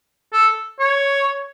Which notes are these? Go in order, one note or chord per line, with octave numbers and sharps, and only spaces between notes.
A4
C#5